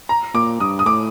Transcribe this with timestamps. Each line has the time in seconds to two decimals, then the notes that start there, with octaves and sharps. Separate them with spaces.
0.09 A#5
0.34 A#2 D6
0.60 G2 D#6
0.79 D#6
0.86 A2 D6